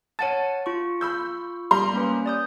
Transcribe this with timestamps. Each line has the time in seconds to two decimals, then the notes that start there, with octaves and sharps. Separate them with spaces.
0.19 C#5 F#5 A5 A6 D#7
0.66 F4 C#6
1.01 B5 E6 G6
1.71 G3 A#5 C6
1.93 A#3 C#4 B4
2.26 D5 D#6 G6